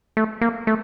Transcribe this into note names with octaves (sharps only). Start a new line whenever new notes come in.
A3
A#3
A3